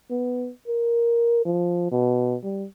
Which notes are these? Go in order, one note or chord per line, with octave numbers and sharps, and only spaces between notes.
B3
A#4
F3
B2
G3